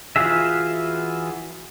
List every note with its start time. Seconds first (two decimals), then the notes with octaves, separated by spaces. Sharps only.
0.16 E3 F4 F#4 G#4 E5